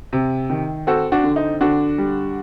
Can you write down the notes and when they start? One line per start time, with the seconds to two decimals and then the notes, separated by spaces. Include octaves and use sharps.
0.13 C3
0.50 D#3
0.87 C4 F#4 A4
1.12 D4 F#4
1.24 D3
1.36 D#4
1.61 D3 D4 F#4
1.98 G3